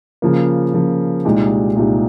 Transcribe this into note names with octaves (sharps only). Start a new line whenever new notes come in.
C#3 F3 A#3
C#3 F3 A#3
C2 A#2 G#3 D#4 G4
C2 A#2 G#3 D#4 G4